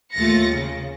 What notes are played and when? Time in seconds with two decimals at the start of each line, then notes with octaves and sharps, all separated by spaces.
0.15 D#2 A3 F4 A6 A#6 C#7
0.49 C#3